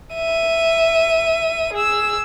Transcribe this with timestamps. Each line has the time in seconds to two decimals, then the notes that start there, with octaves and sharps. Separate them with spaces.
0.15 E5 D#7
1.73 G#4 E6